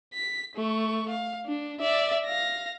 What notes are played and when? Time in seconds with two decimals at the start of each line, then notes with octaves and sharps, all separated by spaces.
0.14 B6
0.56 A3 C#6
1.09 F5
1.47 D4
1.80 D5 E5
2.25 F5 A#6